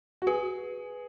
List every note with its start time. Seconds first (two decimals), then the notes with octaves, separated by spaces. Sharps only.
0.22 F#4
0.27 G#4 B4